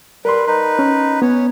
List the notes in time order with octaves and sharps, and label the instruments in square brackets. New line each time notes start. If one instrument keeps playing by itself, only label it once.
[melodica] G3 B4 [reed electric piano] A#4 C6
[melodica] D#4 B4
[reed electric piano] C#4
[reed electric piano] B3 [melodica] C#4 C#5